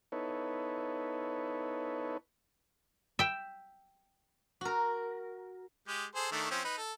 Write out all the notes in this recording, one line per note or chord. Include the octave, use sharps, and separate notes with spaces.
B3 D#4 E4 A4 B4 C#5
E5 G5
F#4 A#4
G#3 G4
G#4 A4 C5
D#3 A3 D4
F3 C4 C#4
D#4 B4
A4